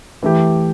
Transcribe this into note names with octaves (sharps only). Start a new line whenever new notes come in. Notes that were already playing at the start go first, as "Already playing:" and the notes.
E3 A3 E4 G4